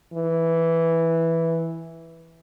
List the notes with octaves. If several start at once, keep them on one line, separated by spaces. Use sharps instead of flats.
E3